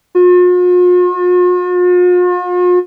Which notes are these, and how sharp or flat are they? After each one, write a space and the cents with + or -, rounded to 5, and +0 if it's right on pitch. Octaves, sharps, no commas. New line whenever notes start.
F4 +45